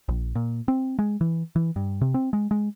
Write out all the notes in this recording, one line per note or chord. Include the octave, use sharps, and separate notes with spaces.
A#1
A#2
C4
G#3
E3
E3
G2
C3
C4
G#3
G#3